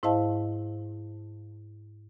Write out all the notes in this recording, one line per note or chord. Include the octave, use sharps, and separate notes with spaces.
G#2 E4 C5 D#5 F5 A5